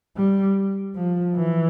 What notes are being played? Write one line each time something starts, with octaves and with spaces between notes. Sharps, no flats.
G3
F3
E3